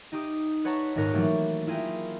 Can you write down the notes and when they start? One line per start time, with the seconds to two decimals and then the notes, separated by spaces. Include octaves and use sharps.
0.12 D#4 G4 D#6
0.65 B4 C#5 F#5 A5 A#5
0.95 D#1 G#2 D#4 A#4 F#6 C#7
1.13 E3 F#3 A3 A#3 G4
1.67 E4 F4 G#4 A#4 G5